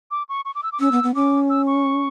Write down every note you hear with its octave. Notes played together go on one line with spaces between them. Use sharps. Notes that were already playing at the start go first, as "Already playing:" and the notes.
D6
C#6
C#6
D6
E6
D6
C#4 E6
B3
B3
C#4 D6
E6
C#6